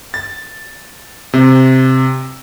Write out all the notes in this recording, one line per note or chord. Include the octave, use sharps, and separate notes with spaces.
A6
C3